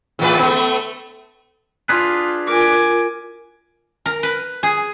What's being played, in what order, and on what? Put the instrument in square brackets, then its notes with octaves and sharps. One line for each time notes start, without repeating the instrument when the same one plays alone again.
[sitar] E2 A2 B4
A3 B3
[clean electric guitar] D4 G#4 B4 [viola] F4
[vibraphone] F4 A#4 [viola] G#5 D6
[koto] A#4
B4
G#4